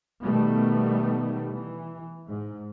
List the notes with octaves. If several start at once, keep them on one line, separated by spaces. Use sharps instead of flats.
B2 D#3 G3 A3 B3
E3
G#2